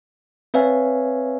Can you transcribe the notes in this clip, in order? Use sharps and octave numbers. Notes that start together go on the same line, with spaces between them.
C4 B4 C#5 E5 F5 G#5